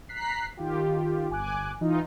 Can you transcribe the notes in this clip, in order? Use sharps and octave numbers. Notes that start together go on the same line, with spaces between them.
A#5 F#6 B6 C7
D#3 F4 G4
G1 G#5 D6 F#6
E3 D#4 F4